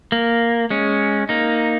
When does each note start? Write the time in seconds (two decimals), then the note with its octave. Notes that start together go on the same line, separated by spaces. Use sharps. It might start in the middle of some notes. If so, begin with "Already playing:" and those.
0.12 A#3
0.70 G#3 C#4
1.29 A#3 D#4